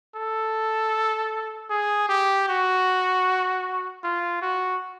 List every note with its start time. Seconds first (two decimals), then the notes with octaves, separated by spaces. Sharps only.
0.16 A4
1.70 G#4
2.09 G4
2.49 F#4
4.04 F4
4.42 F#4